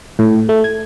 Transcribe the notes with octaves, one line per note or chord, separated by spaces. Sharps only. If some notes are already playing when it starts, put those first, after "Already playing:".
A2
A3
G#6